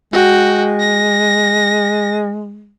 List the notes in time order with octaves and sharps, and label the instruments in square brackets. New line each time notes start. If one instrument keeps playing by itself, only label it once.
[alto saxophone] G#3 [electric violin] F#4 G5
[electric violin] A#6